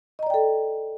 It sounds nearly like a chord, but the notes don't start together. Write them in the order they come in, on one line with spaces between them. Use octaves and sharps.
D#5 A#5 D5 G5 A4